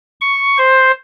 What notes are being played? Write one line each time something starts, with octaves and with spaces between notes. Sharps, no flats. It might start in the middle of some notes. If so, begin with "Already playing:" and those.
C#6
C5